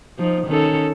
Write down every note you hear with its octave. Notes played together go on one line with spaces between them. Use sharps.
F3 D#4
D#3 C#4 A4